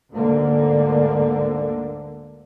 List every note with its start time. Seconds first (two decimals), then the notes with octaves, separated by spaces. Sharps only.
0.11 D2 G#2 D3 A#3